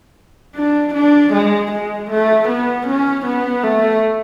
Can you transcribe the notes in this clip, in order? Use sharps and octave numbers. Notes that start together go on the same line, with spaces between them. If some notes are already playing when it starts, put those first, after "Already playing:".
D4
D4
G#3
G#3
A3
B3
C#4
B3
A3